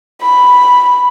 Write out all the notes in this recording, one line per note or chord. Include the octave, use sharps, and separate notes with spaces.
B5